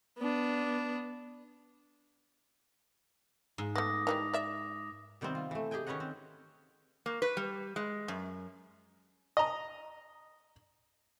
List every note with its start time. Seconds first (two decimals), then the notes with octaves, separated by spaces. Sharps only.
0.18 B3 D4
3.58 G#2
3.76 A3 B3 D6 D#6 A#6
4.07 D#3 E3 G3 F7
4.34 D5 E5
5.21 C3 D#3 G3 B3 C4
5.35 F4
5.51 E3 A3
5.71 G4 G#4 D#5 G5 G#5
5.87 D#3 C#4 B4 C#5 D#5 F#5
6.00 C4
7.06 A#3
7.22 B4
7.37 G3
7.76 G#3
8.08 F#2
9.37 D#5 A#5